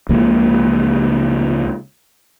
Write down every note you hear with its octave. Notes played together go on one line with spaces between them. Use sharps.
C#2 C#3 F3 A#3